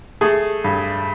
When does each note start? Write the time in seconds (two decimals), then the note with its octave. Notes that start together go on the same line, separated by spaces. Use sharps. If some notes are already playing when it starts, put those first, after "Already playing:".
0.21 A3 G#4
0.64 G2